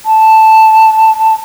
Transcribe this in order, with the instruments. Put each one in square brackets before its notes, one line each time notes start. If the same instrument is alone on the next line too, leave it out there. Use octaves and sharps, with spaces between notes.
[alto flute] A5